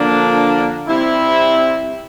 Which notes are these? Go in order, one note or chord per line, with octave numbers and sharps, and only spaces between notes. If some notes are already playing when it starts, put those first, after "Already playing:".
Already playing: D3 F3 A#3 D4
C3 G3 C4 E4